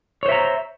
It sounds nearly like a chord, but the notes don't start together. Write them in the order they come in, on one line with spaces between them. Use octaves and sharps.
C#5 C5 E5 A#5